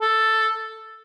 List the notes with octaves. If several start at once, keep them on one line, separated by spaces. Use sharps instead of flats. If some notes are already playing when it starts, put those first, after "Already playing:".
A4